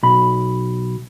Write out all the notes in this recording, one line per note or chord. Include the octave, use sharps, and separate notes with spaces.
B1 B5